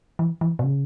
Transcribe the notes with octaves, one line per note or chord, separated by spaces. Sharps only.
E3
E3
B2
C#3